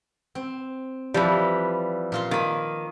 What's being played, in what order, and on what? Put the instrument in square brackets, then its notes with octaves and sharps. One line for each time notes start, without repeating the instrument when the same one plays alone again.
[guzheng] C4
[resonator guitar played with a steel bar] E3 G3 [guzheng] F3
[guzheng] A#2 F4 C6
[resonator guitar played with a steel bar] D#3 [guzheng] A#3 B5